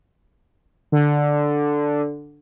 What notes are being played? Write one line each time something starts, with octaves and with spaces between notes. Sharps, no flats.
D3